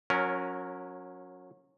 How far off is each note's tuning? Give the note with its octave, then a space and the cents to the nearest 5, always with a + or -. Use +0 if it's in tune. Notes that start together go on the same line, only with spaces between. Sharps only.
F#3 -25 C#4 +0 A#4 +0